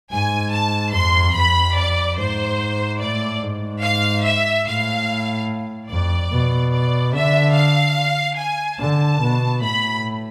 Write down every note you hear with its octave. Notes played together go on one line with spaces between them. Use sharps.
G#2 G#5
A5
F2 C6
F2 B5
D5
G#2 C5
A2 D5
G#2
F5
E5
A2 F5
F2 D5
B2
D5
D3 E5
F5
G#5
D3 A5
B2
A2 B5